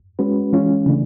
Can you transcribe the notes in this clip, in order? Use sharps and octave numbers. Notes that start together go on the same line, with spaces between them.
G#3 C#4 F#4 B4
E3 G#3 C#4 F4
C#3 E3 A3 D4